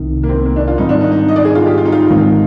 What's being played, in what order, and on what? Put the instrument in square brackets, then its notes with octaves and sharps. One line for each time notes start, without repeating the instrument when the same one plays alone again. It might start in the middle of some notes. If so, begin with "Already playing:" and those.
Already playing: [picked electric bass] C2 C3 D#3
[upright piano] A#3
C4
A#3
D4
F4
[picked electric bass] G#2 D#3 G3 C4 [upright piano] D#4
[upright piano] D4
D#4
D#4
D#5
D5
G#4
F4
G4
F4
D#4
F4
[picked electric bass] G#2 D#3 G#3 C4